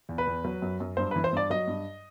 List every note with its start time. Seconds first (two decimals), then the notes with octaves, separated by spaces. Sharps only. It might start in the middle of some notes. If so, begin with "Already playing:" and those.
0.09 E2
0.18 B4
0.27 E2
0.45 F#3
0.62 F#2
0.80 F#2
0.97 G2 C5
1.11 B4
1.16 E3
1.24 C5
1.33 G2 D5
1.50 F#3 D#5
1.67 G2